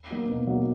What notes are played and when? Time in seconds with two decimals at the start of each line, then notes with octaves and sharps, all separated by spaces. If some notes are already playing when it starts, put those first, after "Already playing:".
0.10 F#3 A#3 D#4 F#4
0.29 B2
0.47 F#3 A#3 D#4 F#4